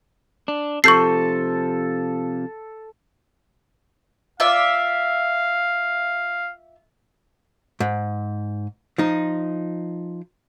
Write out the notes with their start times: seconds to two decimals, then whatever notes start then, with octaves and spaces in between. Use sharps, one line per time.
0.48 D4
0.84 C3 F3 A4 C#6 G6 C7
4.40 F4 D5 E5 F5
7.80 G#2
8.98 F3 D#4